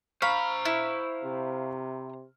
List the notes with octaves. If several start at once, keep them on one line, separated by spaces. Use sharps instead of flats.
C5 F5 A#5 B5 C#6 F6
E4
C3